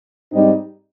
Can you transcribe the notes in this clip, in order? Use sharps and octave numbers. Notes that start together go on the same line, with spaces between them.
G#2 G3 C4 D#4